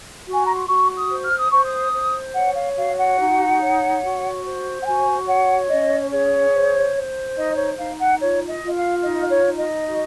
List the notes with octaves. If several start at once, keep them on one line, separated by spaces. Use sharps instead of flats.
F#4
G#5
A#5
C6
F#4 C#6
D#6
C5
F6
D#6
C5 C#6
D#6
C5
C#5 F#5
F5
F#4 F5
F#5
D#4
C#5
F#4
C5
F#5
F#4 G#5
C#5 F#5
C#4 D#5
G#4 C#5
C5
C5
D#4 D#5
C#5
D#4 F5
F#5
F4 C#5
D#5
F4
F5
D#4 D#5
C#5
D#4
D#5
F#4